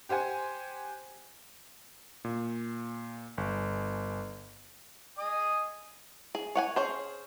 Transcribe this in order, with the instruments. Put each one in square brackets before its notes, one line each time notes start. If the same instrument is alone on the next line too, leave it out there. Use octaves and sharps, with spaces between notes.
[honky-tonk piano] G4 C5 F#5 G#5
[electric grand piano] A#2
G1
[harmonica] D#5 G#5 D#6
[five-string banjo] G#4
C#5 F#5 G#5
C#4 G#4 C5